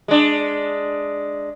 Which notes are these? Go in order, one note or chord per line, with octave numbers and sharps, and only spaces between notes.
G#3 D4